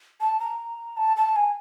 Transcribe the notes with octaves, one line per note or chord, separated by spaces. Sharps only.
A5
A#5
A5
A5
G#5